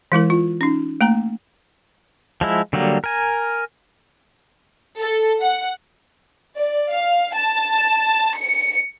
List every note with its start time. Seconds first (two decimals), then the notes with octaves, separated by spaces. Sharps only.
0.12 E3 G#3 E4 A#4
0.30 F4
0.61 C#4 D#4
1.01 A3 A#3 A#5
2.41 F3 G#3 E4
2.73 D3 F#3 G3 A#3
3.04 A#4 G#5
4.98 A4
5.41 F#5
6.56 D5
6.91 F5
7.36 A5
8.37 C#7